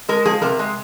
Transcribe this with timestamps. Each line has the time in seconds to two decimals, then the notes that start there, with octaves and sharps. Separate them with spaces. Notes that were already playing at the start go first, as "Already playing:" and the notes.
0.09 G#3 A#4
0.25 F3 G#4
0.42 C3 A#4
0.59 G#3